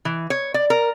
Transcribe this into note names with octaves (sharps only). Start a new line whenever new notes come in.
E3
C#5
D5
A#4